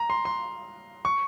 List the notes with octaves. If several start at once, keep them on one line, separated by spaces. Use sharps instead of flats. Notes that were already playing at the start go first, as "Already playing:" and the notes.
Already playing: A#5
C6
C6
C#6